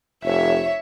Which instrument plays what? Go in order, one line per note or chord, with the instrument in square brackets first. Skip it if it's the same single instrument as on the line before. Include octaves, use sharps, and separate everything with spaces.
[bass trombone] F1 [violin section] C#5 E5